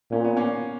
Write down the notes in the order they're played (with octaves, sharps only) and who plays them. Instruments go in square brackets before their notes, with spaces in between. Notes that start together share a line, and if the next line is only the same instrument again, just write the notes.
[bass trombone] A#2 [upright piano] C#4
[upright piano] B3
A#3 C#4